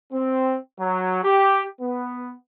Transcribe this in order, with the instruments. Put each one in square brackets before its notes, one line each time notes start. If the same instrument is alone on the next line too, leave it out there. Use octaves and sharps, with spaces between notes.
[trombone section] C4
F#3
G4
B3